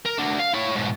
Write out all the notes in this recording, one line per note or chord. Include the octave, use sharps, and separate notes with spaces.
A#4
D4 F#4
F5
E4 C#5
G#2 B2